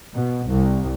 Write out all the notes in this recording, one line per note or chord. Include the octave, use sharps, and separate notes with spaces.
B2
C2